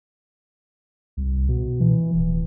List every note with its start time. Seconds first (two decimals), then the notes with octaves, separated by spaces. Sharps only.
1.17 C2
1.48 B2
1.80 E3
2.13 D1